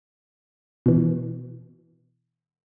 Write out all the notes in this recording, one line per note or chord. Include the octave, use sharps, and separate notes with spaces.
B2 E3